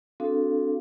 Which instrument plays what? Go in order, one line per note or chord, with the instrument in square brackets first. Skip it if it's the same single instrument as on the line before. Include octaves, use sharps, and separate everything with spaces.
[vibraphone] C4 D4 F#4 A4 F5